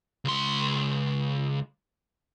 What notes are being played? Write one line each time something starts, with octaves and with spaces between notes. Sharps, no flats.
C#2 C6